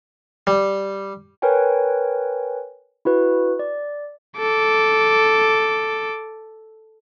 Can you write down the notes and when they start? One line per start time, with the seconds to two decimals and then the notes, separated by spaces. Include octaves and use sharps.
0.47 G3
1.42 A#4 B4 C#5 G5 G#5
3.05 E4 F#4 B4
3.59 D5
4.38 A4 D6